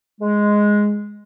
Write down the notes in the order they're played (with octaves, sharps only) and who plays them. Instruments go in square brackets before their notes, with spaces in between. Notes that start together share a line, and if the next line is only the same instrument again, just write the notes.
[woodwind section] G#3